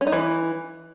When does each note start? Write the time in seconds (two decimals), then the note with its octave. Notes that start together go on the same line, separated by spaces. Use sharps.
0.01 C#4
0.07 D#4
0.12 E3